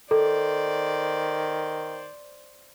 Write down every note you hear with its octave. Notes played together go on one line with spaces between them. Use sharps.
D#3 A4 C5 D5